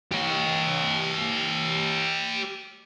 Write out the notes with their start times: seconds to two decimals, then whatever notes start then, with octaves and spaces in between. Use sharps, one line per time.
0.12 G4 C#5